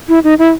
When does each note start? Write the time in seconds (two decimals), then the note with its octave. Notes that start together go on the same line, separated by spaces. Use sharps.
0.09 E4
0.24 D#4
0.39 E4